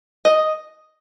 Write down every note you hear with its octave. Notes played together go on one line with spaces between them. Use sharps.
D#5